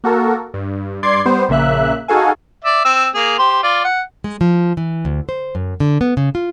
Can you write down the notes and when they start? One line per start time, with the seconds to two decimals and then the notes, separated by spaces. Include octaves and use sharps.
0.04 A#3 F#4 A4 A#4
0.54 G2
1.03 G2 D5 C6 D6 G#6 C7
1.25 G3 B3 C5
1.49 A#1 C#3 A#3 E5 F#6
2.08 D#4 F#4 G#4 A4 F5 G#5
2.65 D5 E5
2.85 C4 E6
3.15 A#3 G#4
3.39 G4 C5 C6
3.63 F4 D5
3.85 F#5
4.24 G#3
4.41 F3
4.77 E3
5.05 D2
5.29 C5
5.55 F#2
5.80 D3
6.01 B3
6.17 C#3
6.35 F4